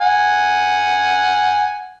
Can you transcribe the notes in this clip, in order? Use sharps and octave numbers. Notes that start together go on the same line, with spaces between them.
F#5 G#5